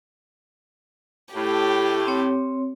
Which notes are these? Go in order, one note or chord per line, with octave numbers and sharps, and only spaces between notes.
A2 G4
C4 C#5